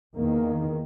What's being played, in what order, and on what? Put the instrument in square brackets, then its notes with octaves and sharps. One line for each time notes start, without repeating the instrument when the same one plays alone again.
[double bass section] E2 D#3 A#3